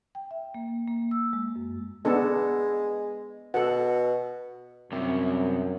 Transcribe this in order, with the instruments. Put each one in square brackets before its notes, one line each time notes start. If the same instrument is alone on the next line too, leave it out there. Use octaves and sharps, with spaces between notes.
[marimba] G5
E5
A#3
A#3
E6
G#3
F#2
[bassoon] G#3 [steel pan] B3 D4 A4
[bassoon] B2 [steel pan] A4 F#5
[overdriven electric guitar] C2 C3 [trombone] F#2